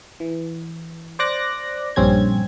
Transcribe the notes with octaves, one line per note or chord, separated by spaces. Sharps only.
E3
C5 D5 D6 F#6 A#6
A#1 G2 C4 C#4 G#6